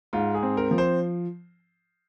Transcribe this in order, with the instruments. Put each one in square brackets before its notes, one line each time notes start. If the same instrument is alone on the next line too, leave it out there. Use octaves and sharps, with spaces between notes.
[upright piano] G#2 [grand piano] F4
[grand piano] G#4
[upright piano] C4
[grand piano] A#4
[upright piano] F3
[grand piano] C5